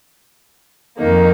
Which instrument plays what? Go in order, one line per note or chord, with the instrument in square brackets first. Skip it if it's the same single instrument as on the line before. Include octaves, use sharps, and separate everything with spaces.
[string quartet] F2 D#3 A#3 D#4